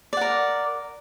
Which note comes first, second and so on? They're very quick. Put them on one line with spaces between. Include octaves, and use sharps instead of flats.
D5 F#5 A#4